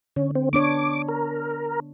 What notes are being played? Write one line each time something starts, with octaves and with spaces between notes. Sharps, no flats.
D3 C#4
C4
B3 D4 C#5 D6
A#4